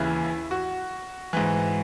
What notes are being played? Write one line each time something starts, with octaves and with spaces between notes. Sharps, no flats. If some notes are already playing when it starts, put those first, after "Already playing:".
Already playing: D#2 C#3 E3 E4
F#4
G#2 E3